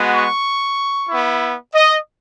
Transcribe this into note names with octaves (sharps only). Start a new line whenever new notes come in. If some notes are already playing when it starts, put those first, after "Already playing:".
Already playing: G#3 B3 F#4
C#6
B3 E4
D#5